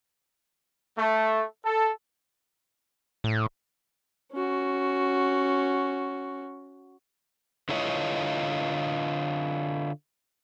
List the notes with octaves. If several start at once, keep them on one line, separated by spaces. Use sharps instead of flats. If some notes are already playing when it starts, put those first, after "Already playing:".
A3
A4
A2
C#4 F#4
D3 E4 F4 C#5 D#5